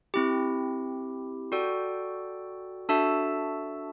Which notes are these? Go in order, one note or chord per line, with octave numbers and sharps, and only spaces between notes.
C4 E4 G4
F#4 A4 D5 G5
D4 F#4 A4 E5 A5